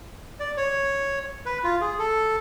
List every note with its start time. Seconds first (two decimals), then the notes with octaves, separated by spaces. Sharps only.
0.40 D5
0.57 C#5
1.46 B4
1.64 F4
1.81 G#4
1.99 A4